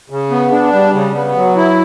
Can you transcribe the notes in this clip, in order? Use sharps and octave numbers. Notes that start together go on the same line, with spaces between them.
C#3
B3
D4
G3
C#3
B3
F#3
E4